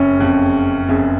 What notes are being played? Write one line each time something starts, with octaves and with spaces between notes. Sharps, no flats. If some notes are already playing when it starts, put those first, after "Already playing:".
Already playing: F#1 F2 C#3 C#4
F#1 F2 C#3
F#1 F2 C#3